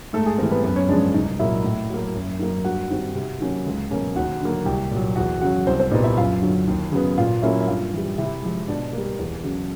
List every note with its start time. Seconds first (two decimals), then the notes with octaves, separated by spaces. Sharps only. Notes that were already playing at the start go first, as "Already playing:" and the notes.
0.13 G#2 A3 A4
0.26 G#4
0.38 E3 G3 A#3 C4 A#4
0.51 B3 B4
0.63 F#2 B3 B4
0.76 C#4 C#5
0.88 C#3 F3 G#3 D4 D5
1.14 C2 D#4 D#5
1.39 A#2 F#3 A#3 E4 E5
1.64 A2
1.90 F#3 A#3
2.15 F#2
2.39 D#3 F#3 A#3
2.64 G2 F#4 F#5
2.90 D#3 G3 C4
3.15 C3
3.40 D#3 F#3 A#3 C#4
3.66 C#2
3.91 B2 F#3 A#3 C#4
4.16 D#2 F#4 F#5
4.41 D3 F#3 A#3
4.66 C2 G4 G5
4.91 A#2 F#3
5.16 E2 F#4 F#5
5.41 C#3 F#3 F#4 F#5
5.66 C2 C4 C5
5.80 C4 C5
5.91 A#2 G3 B3 D#4 D#5
6.04 E4 E5
6.18 F#2 F4 F5
6.42 D3 F#3
6.68 D#2
6.92 C#3 F#3 B3
7.18 A#2 F4 F5
7.42 F#3 A#3 C#4 E4 E5
7.60 E5
7.68 G2 F4 F5
7.93 E3 G3
8.18 C3 E4 E5
8.43 F3 G#3
8.68 B2 D4 D5
8.93 A#3
8.98 G3
9.19 E2
9.44 C#3 F#3